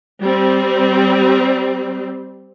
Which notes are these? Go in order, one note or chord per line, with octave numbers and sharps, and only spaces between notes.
G3 C4